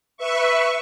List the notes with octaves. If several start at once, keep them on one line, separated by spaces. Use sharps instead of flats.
B4 E5 C#6